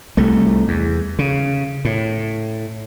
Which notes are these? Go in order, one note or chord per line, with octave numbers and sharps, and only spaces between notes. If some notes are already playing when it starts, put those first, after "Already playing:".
C2 A3
E2
C#3
A2